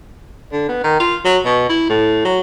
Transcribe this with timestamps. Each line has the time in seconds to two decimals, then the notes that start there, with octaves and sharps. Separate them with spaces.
0.52 D3
0.69 B3
0.84 D#3
1.00 F4
1.25 F#3
1.45 B2
1.69 E4
1.90 A2
2.25 F#3